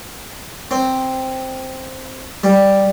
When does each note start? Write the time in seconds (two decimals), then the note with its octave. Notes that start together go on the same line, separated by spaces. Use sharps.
0.71 C4
2.44 G3